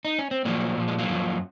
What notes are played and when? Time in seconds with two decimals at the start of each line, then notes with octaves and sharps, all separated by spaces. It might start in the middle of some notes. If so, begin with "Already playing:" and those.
0.05 D#4
0.19 C#4
0.31 C4
0.45 A#2 F3 F#3 A#3
0.77 A#2 F3
0.88 G#3
0.99 F#3 A#3
1.09 F#2 C#3 F3